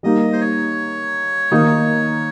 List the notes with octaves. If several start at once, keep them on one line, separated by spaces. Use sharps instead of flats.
G3 A#3 D#4 D#5
C5
C#5
D#3 A#3 D#4